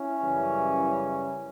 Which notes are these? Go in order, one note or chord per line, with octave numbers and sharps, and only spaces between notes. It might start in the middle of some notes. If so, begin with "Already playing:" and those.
Already playing: C#4 E4
F#2 C#3 E3 G3